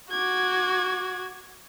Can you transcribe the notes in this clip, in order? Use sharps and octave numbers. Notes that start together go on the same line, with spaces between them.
F#4 D6 G#6